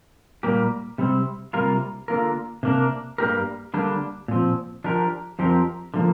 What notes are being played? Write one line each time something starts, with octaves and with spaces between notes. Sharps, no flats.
A#2 G3 A#3 G4
C3 G3 C4
C3 G3 A#3 F4 A#4
D3 A#3 F4 A#4
C3 A#3 D4 A#4
G2 G3 A#3 G4 A#4
D3 G3 A#3 D4
A#2 F3 C4
F3 D4 G4 A#4
F2 F3 C4 G4 A#4
D3 F3 A#3